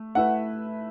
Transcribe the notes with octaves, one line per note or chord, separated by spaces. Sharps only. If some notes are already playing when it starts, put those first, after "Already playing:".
Already playing: A3
A3 E4 B4 E5 F#5